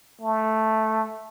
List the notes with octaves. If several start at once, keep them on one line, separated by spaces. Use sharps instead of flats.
A3